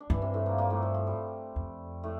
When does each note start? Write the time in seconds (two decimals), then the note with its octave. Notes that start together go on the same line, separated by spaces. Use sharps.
0.01 D4
0.10 G2 E3 E4
0.21 C3 C4
0.34 A2 A3
0.46 A#2 A#3
0.58 A#2 A#3
0.70 A2 A3
0.82 F3
0.94 F3
1.07 G3
1.56 F2
2.04 A2 A3